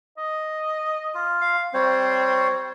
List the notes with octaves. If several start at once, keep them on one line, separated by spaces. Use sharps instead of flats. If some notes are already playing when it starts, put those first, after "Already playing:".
D#5
F4
F5
G3 C4 C5 C#5